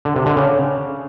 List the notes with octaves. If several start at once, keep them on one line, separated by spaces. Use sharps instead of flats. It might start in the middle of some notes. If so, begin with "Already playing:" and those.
D3
C3
D3
C#3